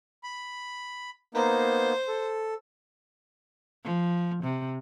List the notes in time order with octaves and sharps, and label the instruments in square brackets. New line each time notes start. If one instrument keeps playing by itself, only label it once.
[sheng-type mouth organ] B5
[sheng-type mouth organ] A#3 B3 D#4 [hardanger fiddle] C5
[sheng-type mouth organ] A4
[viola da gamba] F3
C3